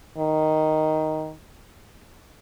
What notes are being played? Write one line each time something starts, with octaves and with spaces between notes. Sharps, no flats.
D#3